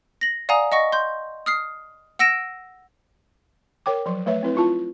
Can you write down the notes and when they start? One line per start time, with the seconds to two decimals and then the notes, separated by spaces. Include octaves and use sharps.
0.21 A#6 F#7
0.49 D5 F5 F#5 G#5 A#5 D#6
0.72 D#5 F#5 C#6 A#6
0.92 C6 G6
1.46 D#6 F6 C7
2.19 F#5 E6 A#6 D7 E7
3.86 A#4 C#5 G5 D6
4.06 F3 F#3 C6
4.26 A3 B4 C#5 E5
4.43 C4 E4 B4
4.55 E4 F4 A5